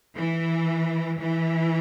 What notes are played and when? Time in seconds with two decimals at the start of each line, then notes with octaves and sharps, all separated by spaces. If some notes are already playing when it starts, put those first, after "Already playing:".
0.15 E3
1.19 E3